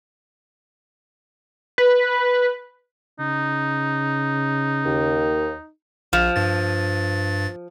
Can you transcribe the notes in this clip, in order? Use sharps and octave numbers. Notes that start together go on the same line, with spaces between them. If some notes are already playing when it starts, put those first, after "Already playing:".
B4
C#3 D#4
D#2
A#1 F3
G2 A6